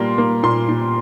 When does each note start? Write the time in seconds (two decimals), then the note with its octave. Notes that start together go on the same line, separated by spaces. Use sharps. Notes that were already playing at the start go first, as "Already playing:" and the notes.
Already playing: A#2 G3 A#3 C6
0.18 A#3
0.43 A#2 C6
0.69 A#2